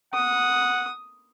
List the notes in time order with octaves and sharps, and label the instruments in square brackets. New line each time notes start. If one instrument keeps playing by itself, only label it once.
[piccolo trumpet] F#5 [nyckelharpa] D#6